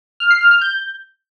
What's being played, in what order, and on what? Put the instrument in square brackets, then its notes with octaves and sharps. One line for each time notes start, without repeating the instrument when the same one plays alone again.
[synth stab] F6
C7
F6
F6
G6